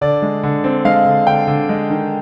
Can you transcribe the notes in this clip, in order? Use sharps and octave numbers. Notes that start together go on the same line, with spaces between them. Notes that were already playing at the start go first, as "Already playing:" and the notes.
D3 D5
G#3
D3
C4
G#3 F5
D3
D3 G5
D3
G#3
D#3